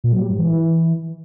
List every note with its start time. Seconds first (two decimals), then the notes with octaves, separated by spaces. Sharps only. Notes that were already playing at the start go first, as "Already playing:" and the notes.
0.04 A#2
0.12 F#3
0.21 G3
0.30 G#2
0.38 E3